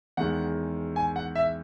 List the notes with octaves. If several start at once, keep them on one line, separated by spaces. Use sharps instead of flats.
E2 D#3 G#3 F#5
G#5
F#5
E5